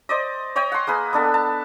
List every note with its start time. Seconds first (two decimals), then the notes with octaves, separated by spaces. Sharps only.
0.09 C5 D5 D#5
0.56 C#5 D#5 G5
0.72 F#5 C6
0.87 A#3 G#4 B4
1.13 B3 D4 A4
1.34 A5